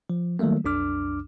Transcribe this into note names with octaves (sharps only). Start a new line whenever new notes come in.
F3
D#3 F#3 G3 A3 A#3
B1 F2 D4 D6 F6